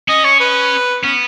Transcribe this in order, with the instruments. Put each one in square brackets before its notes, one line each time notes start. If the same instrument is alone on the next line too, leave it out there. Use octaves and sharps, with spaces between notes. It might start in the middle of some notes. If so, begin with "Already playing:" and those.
[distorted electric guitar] C#4 [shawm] D#5
[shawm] C#5
B4
[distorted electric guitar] B3 [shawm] C#4